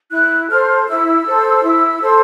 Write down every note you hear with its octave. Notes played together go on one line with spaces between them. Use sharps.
E4 F#6
A4 C5 F6
E4 E6
A4 C5
E4
A4 C5